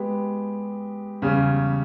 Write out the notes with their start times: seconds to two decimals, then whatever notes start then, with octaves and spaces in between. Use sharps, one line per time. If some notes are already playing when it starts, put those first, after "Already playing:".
Already playing: G#3 B3 G4
1.22 E2 C#3 G3 C#4